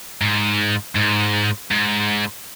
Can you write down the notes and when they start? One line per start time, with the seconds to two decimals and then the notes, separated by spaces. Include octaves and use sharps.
0.21 G#2
0.96 G#2
1.71 G#2